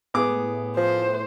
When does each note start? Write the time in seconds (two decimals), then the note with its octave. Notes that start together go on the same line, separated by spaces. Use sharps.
0.14 A2 B3 G#4 D6
0.77 F3 C5